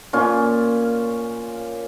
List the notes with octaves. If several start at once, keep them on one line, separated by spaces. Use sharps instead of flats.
A#2 C#4 F4